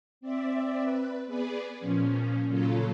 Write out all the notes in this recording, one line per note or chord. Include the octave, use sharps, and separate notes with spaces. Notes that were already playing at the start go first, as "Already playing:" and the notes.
C4 D5 E5
B4
B3 G#4 B4 D5
A#2 F3 C#4
A#2 C#3 F#3 C#4 F4 A4